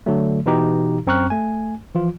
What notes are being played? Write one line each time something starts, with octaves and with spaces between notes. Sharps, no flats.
D3 F#3 A3
B2 E3 D#4 G4 A#5
F#2 C4 A#5 C#6 F6 F#6
A3 G#5
E3 F3 F4